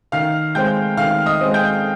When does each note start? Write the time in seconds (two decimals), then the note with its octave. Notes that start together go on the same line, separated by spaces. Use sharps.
0.12 D#3 F5 F6
0.55 G#3 C4 G5 G6
0.97 D#3 F5 F6
1.26 D#5 D#6
1.41 G#3 C4
1.54 G5 G6